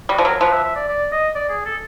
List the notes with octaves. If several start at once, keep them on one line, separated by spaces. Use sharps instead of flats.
G3 F#4
F3
F#3 A#4
F3 B4
E5
E5
D5
D5
D#5
D5
G#4
A4